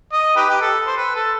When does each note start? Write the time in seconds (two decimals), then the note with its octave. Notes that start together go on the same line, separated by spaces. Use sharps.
0.13 D#5
0.36 D#4 G4 B4
0.49 G4
0.61 A4
0.87 C5
0.97 B4
1.15 A4